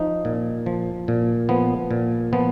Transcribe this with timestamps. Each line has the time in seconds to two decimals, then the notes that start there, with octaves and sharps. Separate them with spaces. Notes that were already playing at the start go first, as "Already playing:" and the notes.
Already playing: F3 D#4
0.25 A#2
0.66 F3
1.08 A#2
1.49 F3 B3
1.91 A#2
2.33 F3 B3